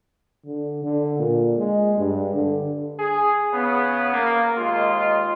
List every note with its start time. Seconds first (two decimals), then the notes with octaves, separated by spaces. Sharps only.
0.46 D3
0.84 D3
1.19 A#2
1.57 G#3
1.97 G2
2.35 D3
3.00 G#4
3.53 C#3 B3
4.14 A#3
4.58 D#2 G#3 F4